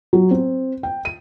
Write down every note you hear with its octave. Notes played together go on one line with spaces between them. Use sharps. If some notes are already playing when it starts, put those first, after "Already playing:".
F#3
C4
G5
D#7